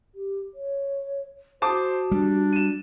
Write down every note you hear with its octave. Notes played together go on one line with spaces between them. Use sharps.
G4
C#5
F#4 C5 A5 D6 D#6
G3 D4
D#7 E7